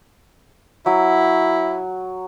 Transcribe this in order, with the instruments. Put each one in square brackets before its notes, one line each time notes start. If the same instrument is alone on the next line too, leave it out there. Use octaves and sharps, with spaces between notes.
[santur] F#3 [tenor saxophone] E4